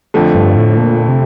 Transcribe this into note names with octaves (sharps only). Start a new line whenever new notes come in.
F2 D3 F3 A3
G2
A2
A#2
C3